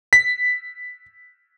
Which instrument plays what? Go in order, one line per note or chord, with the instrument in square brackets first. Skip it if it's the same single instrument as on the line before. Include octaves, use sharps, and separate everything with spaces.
[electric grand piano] B6